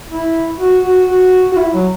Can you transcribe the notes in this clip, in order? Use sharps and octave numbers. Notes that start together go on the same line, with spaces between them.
E4
F#4
F#4
F#4
F#4
E4
F#3